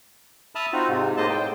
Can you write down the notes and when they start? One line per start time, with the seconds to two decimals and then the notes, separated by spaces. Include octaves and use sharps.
0.55 E5 A5 B5 D#6 F6
0.73 C4 D#4 F4 F#4
0.88 G#2 C3
1.17 A2 G#3 A#3 C5 D#5 A5
1.30 A2 G5